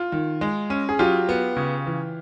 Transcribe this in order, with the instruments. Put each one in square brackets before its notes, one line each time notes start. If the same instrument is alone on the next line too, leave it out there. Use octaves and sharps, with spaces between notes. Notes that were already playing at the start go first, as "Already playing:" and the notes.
Already playing: [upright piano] F4
[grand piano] D#3
G#3
C#4
[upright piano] G#4
[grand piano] F#3 [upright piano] F4 G4
[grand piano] B3
C#3
E3